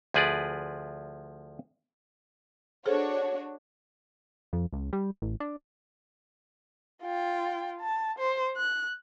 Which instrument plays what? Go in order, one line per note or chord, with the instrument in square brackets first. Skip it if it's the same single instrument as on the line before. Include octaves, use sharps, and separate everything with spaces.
[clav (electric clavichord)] D2 F3 G#4 B4 D5
[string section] D4 F#4 C#5 [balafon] G#4 A4 C5
[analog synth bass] F2
C#2
G3
A1
D4
[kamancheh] F4 G5
A5
C5
F#6